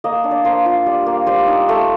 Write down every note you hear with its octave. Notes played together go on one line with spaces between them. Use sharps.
A#3 D#5
D4
D5
A#3 C5
F4
G3
A#3
G3 C5
D#4
A3